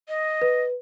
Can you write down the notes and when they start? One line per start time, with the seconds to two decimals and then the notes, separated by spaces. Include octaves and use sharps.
0.09 D#5
0.42 B4